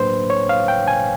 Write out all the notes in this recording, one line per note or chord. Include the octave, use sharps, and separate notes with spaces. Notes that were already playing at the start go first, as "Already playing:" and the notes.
Already playing: A2 F#3 A#3 D4 B4 C5
C#5
F5
G5
G#5